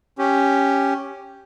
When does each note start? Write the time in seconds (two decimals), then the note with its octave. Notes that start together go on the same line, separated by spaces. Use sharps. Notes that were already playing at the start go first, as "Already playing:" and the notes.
0.18 C#4 G4